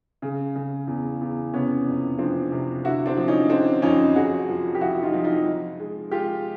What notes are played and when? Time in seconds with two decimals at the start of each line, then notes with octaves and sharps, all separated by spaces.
0.22 C#3
0.56 C#3
0.87 E2
1.21 E2
1.53 C3 B3 C#4
1.87 F2
2.19 F3 C4 D4
2.52 C3
2.84 D3 E4 F#4
3.06 C4 D4
3.17 F3
3.28 C#4 D#4
3.49 D3 C4 D4
3.82 F2 C#4 D#4
4.15 F2 F#4 G#4
4.49 F3
4.75 G4
4.81 F3 E4 F#4
5.03 D#4 F4
5.14 F3
5.24 D#4 F4
5.46 F3
5.79 G#3
6.11 G#3 F4 G4